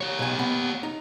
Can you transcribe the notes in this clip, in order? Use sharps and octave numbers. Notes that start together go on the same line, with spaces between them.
G4 C#5
B1 G#5
B3
D#4